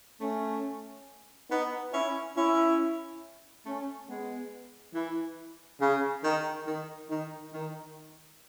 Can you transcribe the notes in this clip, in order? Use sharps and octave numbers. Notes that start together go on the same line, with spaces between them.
A3 C#4
B3 D#4
C#4 E4
C#4 E4
A3 C#4
G#3 B3
E3
C#3
D#3
D#3
D#3
D#3